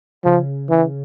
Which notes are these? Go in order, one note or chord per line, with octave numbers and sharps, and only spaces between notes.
C#3 F3
E3